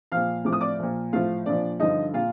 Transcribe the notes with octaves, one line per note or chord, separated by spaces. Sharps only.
A#2 F3 F5 F6
A2 F3 D6
D#6
D5 D6
A#2 F3
A2 F3 F4 F5
A#2 F3 D4 D5
G2 D3 F3 D#4 D#5
A#2 F4 F5